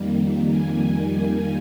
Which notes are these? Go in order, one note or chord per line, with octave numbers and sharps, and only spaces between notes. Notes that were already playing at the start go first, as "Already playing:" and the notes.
Already playing: F2 D#3 G3 A#3
G#5